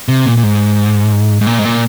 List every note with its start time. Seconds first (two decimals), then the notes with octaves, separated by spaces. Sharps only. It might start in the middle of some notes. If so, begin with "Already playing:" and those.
0.08 C3
0.26 A#2
0.37 A#2
0.43 G#2
1.41 G#2
1.47 A#2
1.59 G#2
1.65 A#2